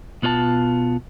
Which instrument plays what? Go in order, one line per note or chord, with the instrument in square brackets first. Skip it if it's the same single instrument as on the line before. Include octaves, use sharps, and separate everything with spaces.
[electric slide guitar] B2 B3 F4 C5 A5